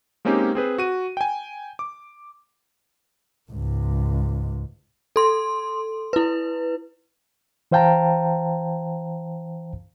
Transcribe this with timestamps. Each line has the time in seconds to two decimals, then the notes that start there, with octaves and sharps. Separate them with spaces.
0.25 G#3 A#3 C4 C#4 D#4 G4
0.55 C4 G#4 B4 C5
0.78 F#4 D#7
1.17 G5 G#5
1.79 D6
3.51 C#2 G#2
5.16 A4 C6
6.13 E4 B4
7.72 E3 C5 F5 G5 A5 A#5